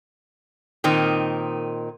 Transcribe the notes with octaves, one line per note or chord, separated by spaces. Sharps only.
A#2 D#3 C4 D#4